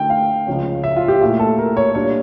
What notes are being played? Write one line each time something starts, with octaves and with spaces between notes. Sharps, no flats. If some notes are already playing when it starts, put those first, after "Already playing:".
Already playing: D3 A3 E4 G5
F5
C#2 C#3 F3 C#4
E5
F4
G4
A#2 A3 E4
A4
A#4
C#5
A#2 G3 D4 C#5